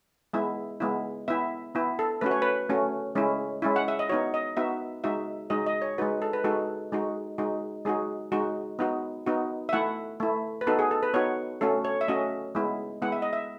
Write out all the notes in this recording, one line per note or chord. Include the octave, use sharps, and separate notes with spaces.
G#3 B3 E4 E5
G#3 B3 E4
B3 E4 E5
B3 E4
A4
A3 C#4 F#4 B4
C#5
B4
A3 C#4 F#4
G#3 C#4 E4
G#3 C#4 E4
F#5
E5
D#5
B3 D#4 F#4 C#5
D#5
B3 D#4 F#4 E5
G#3 D#4 F#4 E5
G#3 D#4 F#4 D#5
D#5
C#5
G#3 D#4 F#4 B4
A4
B4
G#3 D#4 F#4 A4
G#3 D#4 F#4
G#3 D#4 F#4
G#3 D#4 F#4 G#4
G#3 D#4 F#4
B3 D#4 F#4
B3 D#4 F#4
E5
A3 E4 F#5
A3 E4
B4
B3 D#4 F#4 A4
G#4
A4
B4
B3 D#4 F#4 C#5
A3 C#4 F#4 A4
C#5
E5
A3 C#4 F#4 D#5
G#3 B3 E4
G#3 B3 E4 F#5
E5
D#5
E5